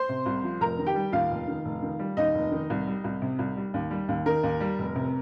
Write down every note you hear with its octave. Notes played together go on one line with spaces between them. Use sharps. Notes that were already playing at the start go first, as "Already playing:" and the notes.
Already playing: C5 C6
C3
C2
F3
F1 A#4 A#5
D#3
G4 G5
G3
D#2 F4 F5
F1
D#3
F1
D#3
G3
D#2 D#4 D#5
F1
D#3
C2
G3
C2
C3
C2
G3
D#2
G3
D#2
D#3 A#4
D#2
G3
F1
C3